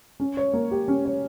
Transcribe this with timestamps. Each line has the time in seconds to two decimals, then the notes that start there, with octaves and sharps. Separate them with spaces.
0.20 C#4
0.37 C#5
0.53 A#3
0.71 G4
0.88 C#4
1.05 C#5